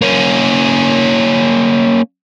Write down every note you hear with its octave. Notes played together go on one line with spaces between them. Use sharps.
A#3 C#4